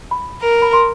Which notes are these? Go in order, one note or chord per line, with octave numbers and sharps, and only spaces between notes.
B5
A#4
B5
C6